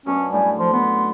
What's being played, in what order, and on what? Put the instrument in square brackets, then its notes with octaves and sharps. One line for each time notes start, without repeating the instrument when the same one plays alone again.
[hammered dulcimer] F#2 B2 D4 [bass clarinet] C#4
[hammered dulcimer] A2 A#5 [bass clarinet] G3 [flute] G#5
[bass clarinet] F3 [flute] C6
[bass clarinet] B3